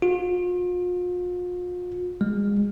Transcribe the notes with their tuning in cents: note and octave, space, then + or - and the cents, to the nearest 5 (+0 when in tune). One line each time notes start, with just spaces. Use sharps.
F4 +40
G#3 -30